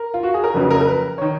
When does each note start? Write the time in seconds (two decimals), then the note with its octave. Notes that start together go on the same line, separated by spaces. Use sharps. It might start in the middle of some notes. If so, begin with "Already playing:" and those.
Already playing: A#4
0.14 F4
0.23 F#4
0.34 G#4
0.44 A#4
0.54 F#1 F2 C#3 F#3 B4
0.70 A#4
0.81 A#4
0.85 B4
1.18 D#3 C#5